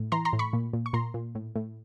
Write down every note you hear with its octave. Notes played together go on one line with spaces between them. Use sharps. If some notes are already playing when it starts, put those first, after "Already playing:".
Already playing: A2
E3 A#5 C6
A#5 C6
A2
B5 C#6
A#2
A#2
C#6
A#2 A#5 C6
A#2
A2
A2